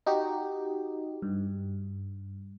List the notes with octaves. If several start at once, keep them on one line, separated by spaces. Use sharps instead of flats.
D#4 F#4 G4
G2